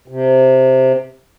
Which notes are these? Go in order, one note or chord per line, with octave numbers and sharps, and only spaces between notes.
C3